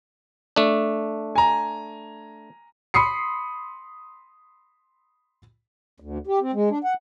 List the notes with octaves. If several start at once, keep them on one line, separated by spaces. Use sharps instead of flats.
A3 D4
G#5 A#5
B5 C6 D#6 C7 C#7
D2
G4
C4
G#3
D4
F#5